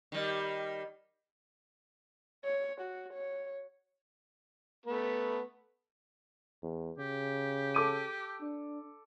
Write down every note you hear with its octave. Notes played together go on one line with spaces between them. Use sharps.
D#3 G3
C#5
F#4
C#5
A3 B3
E2
C#3 G4
A4 D6 D#7
D4